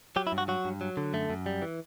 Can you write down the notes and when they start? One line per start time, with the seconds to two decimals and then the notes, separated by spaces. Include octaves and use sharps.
0.16 F#3 G4
0.27 E4
0.32 G2
0.38 F#4
0.48 F#3 F#4
0.65 G2
0.81 F#3
0.97 D3
1.13 F#2 A3
1.30 F#2
1.46 G3
1.62 E3